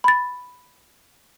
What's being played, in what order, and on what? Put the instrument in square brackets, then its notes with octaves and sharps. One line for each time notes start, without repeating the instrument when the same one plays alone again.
[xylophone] B5 A6